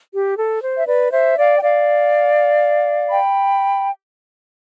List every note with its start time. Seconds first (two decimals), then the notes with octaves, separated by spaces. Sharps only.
0.13 G4
0.37 A4
0.62 C5
0.77 E5
0.87 B4 D5
1.11 C5 E5
1.36 D5 F5
1.56 G5
1.61 D5 F5
3.10 G5 B5